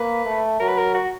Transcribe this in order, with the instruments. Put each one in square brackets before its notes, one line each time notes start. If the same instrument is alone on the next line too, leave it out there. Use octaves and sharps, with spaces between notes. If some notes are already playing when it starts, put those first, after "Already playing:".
Already playing: [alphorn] A#3 [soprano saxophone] B4
[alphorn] A3
[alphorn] F#3 [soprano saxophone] A#4
[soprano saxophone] B4
A#4
F#4